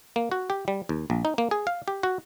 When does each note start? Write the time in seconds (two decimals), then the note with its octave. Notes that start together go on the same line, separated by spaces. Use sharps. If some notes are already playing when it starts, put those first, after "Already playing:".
0.16 A#3
0.32 F#4
0.50 G4
0.68 G3
0.89 D#2
1.10 A#1
1.25 D#4
1.38 A#3
1.51 G#4
1.67 F5
1.88 G4
2.03 F#4